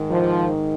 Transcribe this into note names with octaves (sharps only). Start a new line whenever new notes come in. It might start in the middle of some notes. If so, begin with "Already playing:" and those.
Already playing: G#2 D#3
F3